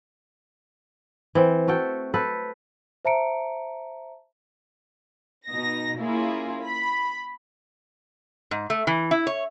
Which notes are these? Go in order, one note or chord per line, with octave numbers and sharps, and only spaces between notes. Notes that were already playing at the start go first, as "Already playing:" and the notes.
E3 C4
A3 F#4 A4 G5
A4 B4 C5
C5 E5 A5 A#5 C#7 D7
B2 D#4 A#6
A#3 C#4 E4 F4 G#4
B5
G#2
A3
E3
E4
C#5